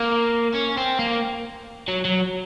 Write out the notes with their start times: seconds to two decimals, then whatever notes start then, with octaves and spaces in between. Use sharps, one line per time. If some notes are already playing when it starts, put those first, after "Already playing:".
Already playing: A#3
0.54 C#4
0.77 C4
0.99 A#3
1.88 F#3
2.05 F#3